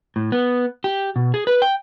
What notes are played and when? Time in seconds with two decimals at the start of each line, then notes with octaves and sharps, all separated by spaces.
0.16 A2
0.32 B3
0.84 G4
1.16 B2
1.34 G#4
1.47 B4
1.62 G5